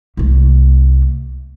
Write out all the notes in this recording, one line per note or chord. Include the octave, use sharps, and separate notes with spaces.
C2 A3